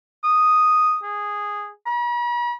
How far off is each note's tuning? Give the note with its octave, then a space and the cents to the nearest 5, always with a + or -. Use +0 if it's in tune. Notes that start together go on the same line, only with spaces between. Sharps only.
D#6 -5
G#4 -10
B5 -45